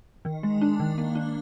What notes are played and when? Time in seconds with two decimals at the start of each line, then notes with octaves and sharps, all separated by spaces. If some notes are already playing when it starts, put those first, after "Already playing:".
0.25 D#3
0.43 G#3
0.61 D4
0.80 D#3
0.98 A#3
1.15 D4